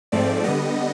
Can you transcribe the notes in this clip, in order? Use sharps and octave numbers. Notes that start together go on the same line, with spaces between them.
G#2 F3 A3 C4 D5
D3 G3 B3 D#5